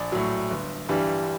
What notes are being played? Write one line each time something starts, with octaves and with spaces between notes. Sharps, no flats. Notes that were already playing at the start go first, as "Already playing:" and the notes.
Already playing: A#1 D5
A2 F#3
G1
G2 E3 G3